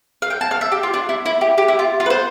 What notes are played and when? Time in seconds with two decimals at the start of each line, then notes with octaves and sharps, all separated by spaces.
0.22 F5
0.30 G5
0.41 A5
0.51 F5
0.61 E5
0.72 G4
0.83 F4
0.94 D4
1.09 E4
1.26 E4
1.41 G4
1.58 G4
1.68 E4
1.79 F4
2.00 F4
2.06 B4
2.10 C5